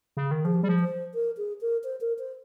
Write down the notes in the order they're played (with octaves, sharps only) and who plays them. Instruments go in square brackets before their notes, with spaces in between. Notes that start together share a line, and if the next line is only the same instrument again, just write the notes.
[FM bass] C#3
D#3
[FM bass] F3 [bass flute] G#4
[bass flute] G4
[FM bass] G3 [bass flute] G#4
[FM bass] F3
[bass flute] C5
A#4
G#4
A#4
C5
A#4
C5